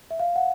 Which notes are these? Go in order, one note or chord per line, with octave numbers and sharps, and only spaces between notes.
E5
F5
F#5